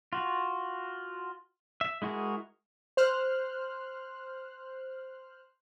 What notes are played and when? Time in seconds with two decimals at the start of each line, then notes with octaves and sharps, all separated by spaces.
0.13 F4 F#4
1.81 E5
2.02 G#3 E4 F#4 G#4 A#4
2.97 C5 F6 F#6